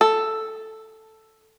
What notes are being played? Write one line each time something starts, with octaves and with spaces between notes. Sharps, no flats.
A4